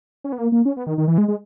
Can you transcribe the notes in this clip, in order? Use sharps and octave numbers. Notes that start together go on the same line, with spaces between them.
C#4
B3
A#3
A#3
C#4
B3
D#3
D#3
E3
G#3
G#3